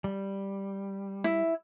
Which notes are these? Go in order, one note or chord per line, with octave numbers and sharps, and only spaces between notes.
G3
E4